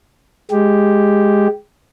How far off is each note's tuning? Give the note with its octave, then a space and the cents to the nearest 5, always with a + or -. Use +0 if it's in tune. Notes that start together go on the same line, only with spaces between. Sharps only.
G#3 +0 G4 +0